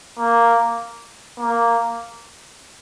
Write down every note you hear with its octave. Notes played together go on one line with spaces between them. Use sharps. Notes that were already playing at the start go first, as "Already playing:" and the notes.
A#3
A#3